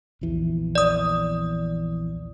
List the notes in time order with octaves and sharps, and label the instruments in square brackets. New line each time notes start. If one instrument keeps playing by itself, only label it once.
[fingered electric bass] A#1 E2 E3
[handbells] D5 D#6